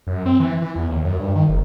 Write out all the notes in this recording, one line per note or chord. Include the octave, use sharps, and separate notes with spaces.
F#2
C4
E3
E3
E2
D#2
F#2
G2
D#3
F#1